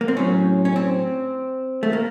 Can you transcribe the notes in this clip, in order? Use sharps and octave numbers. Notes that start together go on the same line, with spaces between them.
A#3
C4
A2 F#3 C#4
C#4
C4
A3
A#3